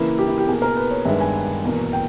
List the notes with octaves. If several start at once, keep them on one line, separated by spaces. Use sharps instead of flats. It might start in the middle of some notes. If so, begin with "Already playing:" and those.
Already playing: C#3 E3 A#3 E4
G4
E4
G4
B2 A#3 G#4
A#4
B4
C#5
G2 D#3 G#3 B3 E5
G#5
E2 B2 A#3
G5